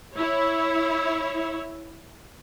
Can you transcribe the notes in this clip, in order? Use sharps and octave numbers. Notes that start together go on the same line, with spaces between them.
E4 C#5